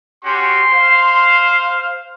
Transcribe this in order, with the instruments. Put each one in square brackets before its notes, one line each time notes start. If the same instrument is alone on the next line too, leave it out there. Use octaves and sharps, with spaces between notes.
[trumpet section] C#4 F#4 G4 [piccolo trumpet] C6
[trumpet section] C5 F5